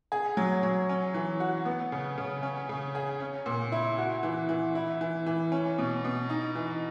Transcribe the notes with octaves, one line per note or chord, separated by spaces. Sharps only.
G#4
F#3
F#3
C#4
E3
F#4
B3
C#3
C#3
C#4
C#3
G#4
C#4
A#2
E4
F#4
E3
E3
E4
E3
E3
C#4
B2
B2
D#4
E3